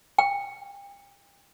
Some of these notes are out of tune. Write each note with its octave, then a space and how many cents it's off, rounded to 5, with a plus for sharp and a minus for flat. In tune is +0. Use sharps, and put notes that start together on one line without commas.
G5 +35